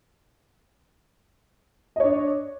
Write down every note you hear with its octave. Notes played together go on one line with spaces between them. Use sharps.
D4 C#5 D#5